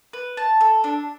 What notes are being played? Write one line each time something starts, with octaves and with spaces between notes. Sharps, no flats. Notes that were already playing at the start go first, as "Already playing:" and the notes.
B4
A5
A4
D4